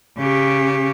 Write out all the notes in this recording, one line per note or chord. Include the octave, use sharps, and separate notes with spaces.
C#3 G4